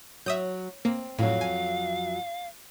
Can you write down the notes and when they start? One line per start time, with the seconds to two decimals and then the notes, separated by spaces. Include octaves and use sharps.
0.26 F#3 E5 D#6 G6
0.85 A#3 C4
1.19 F2 A2 F#3 F5
1.41 G#5